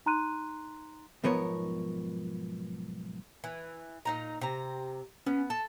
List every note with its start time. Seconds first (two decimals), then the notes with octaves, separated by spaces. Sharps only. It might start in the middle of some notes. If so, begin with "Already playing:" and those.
0.06 D#4 A#5 C6 F#6 D#7
1.24 B1 G#2 F3 B3 A#4 C#5
3.44 E3
4.05 A#2 D#4 A#5
4.41 C3 A#5
5.26 B3 C#4
5.50 A4 A5